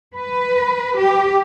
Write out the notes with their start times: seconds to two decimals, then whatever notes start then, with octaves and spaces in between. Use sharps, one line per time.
0.15 B4
0.96 G4